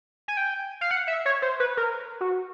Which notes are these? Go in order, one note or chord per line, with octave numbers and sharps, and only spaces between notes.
G#5
G5
F5
F#5
E5
C#5
C5
B4
A#4
F#4